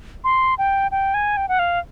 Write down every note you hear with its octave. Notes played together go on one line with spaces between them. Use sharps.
C6
G5
G5
G#5
G5
F#5
F5